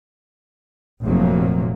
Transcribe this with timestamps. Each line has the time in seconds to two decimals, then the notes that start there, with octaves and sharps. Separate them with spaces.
1.03 F1 F2 A#2 F3 F#3 A#3